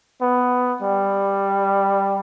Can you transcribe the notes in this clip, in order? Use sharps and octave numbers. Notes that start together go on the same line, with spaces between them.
B3
G3